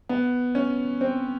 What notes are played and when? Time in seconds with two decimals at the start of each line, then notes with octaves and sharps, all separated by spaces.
0.09 B3
0.55 C#4
1.01 C4